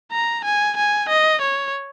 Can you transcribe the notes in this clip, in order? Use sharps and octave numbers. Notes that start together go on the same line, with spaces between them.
A#5
G#5
G#5
D#5
C#5